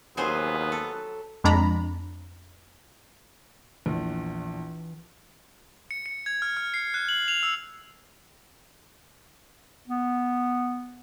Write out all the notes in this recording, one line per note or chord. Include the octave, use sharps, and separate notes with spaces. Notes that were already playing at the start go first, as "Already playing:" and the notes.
D#2 F#3 B3 G#4 C5
A4
F2 G#3 D4 A#5 B5
A#1 E2 E3
C#7
C#7
G#6
F6
F6
C7
F#6
F#7
F7
E6
B3